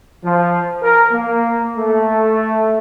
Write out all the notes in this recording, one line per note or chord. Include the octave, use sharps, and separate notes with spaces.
F3
A#4
A#3
A3